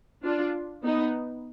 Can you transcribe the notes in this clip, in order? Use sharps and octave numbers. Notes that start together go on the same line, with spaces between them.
D4 F4
B3 D#4